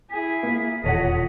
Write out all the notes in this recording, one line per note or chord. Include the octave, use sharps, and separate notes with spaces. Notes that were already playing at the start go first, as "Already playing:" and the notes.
E4 G#4 B6
A#3
D#1 E2 B2 F4 A4 C#5 D#5 F#5